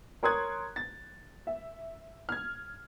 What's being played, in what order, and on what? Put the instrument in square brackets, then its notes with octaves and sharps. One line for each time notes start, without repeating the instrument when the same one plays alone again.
[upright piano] A#4 C#5 C6 D#6 F#6 G#6
A6
E5
F6 G#6